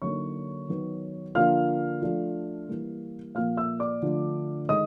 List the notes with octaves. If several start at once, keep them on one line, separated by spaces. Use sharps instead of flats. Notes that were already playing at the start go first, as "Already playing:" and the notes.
D3 F#3 A#3 D#4 C#5 C#6
D#3 F#3 B3
D3 F3 A#3 D4 F4 F5 F6
F3 A3 D4 F4
E3 G3 A#3
A#2 F3 A#3 F5 F6
E5 E6
D5 D6
D3 F3 A3 D4 F4
D#3 G#3 D#5 D#6